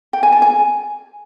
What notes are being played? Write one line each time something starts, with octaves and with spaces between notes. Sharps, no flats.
G5
G#5
A5
G#5